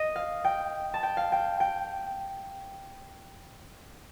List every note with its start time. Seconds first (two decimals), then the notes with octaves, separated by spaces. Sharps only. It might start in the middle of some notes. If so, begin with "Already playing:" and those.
Already playing: D#5
0.16 F5
0.44 G5
0.94 A5
1.03 G5
1.17 F5
1.32 G5
1.60 G5